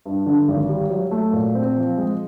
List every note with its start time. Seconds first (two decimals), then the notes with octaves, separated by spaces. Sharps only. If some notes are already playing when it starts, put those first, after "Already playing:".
0.06 G2
0.26 D3
0.48 G#1
0.69 G3
0.90 F#3
1.11 A3
1.33 A#2
1.55 C4
1.76 F3
1.98 G#3